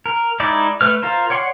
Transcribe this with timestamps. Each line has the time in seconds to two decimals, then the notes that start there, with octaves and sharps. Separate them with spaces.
0.06 A#4
0.40 G#3 D#4 E4 D5
0.81 A3 B4 F6
1.02 F4 A#4 C5
1.30 C#5 D5 F#5 C6